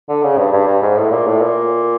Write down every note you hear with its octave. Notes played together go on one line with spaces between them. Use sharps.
D3
C#3
G2
G2
G2
G#2
A2
A#2
A2
A#2